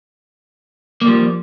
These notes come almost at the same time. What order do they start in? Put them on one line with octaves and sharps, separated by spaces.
A#3 G3 F3